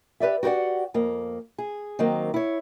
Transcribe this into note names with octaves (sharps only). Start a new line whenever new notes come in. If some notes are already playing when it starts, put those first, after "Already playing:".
G4 B4 D5 E5
F#4 G4 A#4 D5 F#5
F2 A#3
G#4
D#3 F#3 A#3 C4
E4 C#5